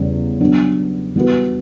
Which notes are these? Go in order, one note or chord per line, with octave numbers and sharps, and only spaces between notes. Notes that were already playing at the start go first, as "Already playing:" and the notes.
Already playing: E2 C#3 G3
F#3 B3 D4
E3 G3 B3 F#4 B4